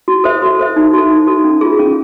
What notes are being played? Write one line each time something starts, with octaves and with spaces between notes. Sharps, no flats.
F#4
A4 C5 E5
F#4
A4 C5 E5
D#4
F#4 A4
D#4
F#4 A4
C#4
F4 G#4
C#4